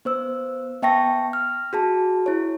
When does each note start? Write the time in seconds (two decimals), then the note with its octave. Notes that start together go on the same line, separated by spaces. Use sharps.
0.05 B3 C5 E6
0.82 B3 E5 G5 A5 C#6 A#6
1.33 F6
1.73 F#4 G#4 A5
2.26 E4 C#5